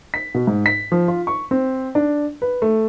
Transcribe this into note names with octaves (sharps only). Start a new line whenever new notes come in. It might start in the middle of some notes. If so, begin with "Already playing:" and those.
B6
B2
G#2
B6
F3
F4
C#6
C4
D4
B4
A3